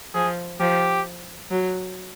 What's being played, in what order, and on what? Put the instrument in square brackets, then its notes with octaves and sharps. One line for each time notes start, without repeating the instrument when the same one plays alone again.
[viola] F3 [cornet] G#4
[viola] F3 [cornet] G4
[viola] F#3